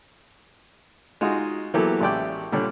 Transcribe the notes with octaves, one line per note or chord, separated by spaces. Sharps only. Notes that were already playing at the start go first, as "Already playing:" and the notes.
G#3 D#4 F4 F#4 G#4
E3 F#3 A#3 B3 G4 A4
A1 G#3 G4 D5 E5 G5
A#2 D3 G3 D4 C#5